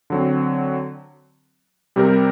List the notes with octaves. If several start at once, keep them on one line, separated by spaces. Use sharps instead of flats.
D3 F#3 C4
C3 G3 C4 G4 A#4